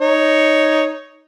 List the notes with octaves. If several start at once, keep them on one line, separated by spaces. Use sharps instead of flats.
D#4 C#5